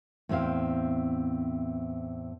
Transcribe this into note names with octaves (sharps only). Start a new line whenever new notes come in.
E2 A2 C4 E4 F5